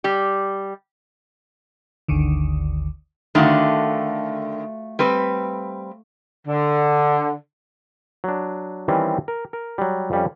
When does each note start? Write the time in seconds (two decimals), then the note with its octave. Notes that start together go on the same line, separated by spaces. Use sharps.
0.04 G3 G4
2.08 G1 D2 D3 D#3
3.35 D3 D#3 A3 F4 F#4
4.99 G3 C4 B4
6.48 D3
8.24 F#3 D4
8.88 D#3 E3 G3 C4 C#4
9.28 A#4
9.53 A#4
9.78 F#3 G3
10.11 F2 G3 C#4